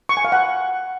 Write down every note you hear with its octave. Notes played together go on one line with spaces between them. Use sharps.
C#6
G#5
F5
F#5